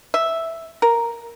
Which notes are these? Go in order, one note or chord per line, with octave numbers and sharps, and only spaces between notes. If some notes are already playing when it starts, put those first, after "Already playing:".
E5
A#4